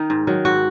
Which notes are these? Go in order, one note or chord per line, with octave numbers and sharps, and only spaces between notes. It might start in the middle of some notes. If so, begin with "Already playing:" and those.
Already playing: D#3 D#4
G#2
D#3 F#3
G#2 F#4